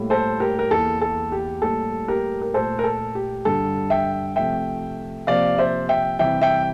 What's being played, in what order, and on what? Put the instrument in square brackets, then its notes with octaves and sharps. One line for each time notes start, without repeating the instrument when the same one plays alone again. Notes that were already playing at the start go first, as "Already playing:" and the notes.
Already playing: [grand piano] A2 G3 A#3
A4 C5
G4 A#4
A#4
E2 E3 A#3 A4
A4
G4
A2 G3 A#3 A4
G4 A#4
A#4
A#2 A3 A4 C5
A#4
A4
G4
G2 D3 G3 A4
E5 G5
C3 F3 A3 E5 G5
C3 F3 A#3 D5 F5
C5 E5
E5 G5
C3 E3 G3 E5 G5
E5 G5